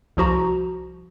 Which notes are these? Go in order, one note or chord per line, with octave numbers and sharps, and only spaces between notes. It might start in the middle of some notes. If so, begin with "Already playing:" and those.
C2 F3 F#4 A#5